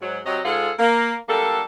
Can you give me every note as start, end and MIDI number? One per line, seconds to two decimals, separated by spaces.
0.01 0.19 44
0.01 0.19 54
0.25 0.39 48
0.25 0.39 54
0.25 0.39 75
0.44 0.71 44
0.44 0.71 56
0.44 0.71 65
0.44 0.71 68
0.44 0.71 69
0.44 0.71 78
0.79 1.15 58
1.28 1.61 54
1.28 1.61 55
1.28 1.61 58
1.28 1.61 62
1.28 1.61 69